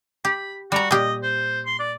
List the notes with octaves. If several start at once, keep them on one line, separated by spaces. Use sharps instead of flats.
G4 B5
G3 F#4 A#5
A#2 G4 D#5
C5
C6
D5